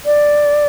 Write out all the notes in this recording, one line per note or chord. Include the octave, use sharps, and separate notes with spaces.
D5